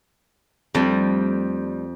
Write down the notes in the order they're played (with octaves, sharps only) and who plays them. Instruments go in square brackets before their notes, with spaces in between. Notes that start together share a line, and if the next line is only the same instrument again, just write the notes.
[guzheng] F2 [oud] G3 A3 D4